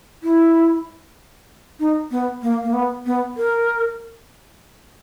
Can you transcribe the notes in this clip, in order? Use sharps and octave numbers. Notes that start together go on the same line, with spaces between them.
E4
D#4
B3
A#3
A#3
B3
B3
A#4